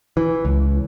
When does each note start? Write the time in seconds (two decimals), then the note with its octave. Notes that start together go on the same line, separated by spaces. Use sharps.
0.17 E3
0.45 C#2